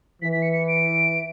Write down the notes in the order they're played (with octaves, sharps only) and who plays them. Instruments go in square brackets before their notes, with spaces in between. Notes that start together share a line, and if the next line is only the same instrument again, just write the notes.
[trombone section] E3 [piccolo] B6
[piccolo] B6
C#7
C#7
D7